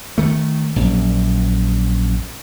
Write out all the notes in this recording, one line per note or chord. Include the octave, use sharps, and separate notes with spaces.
D#3 A3
A#1 F#2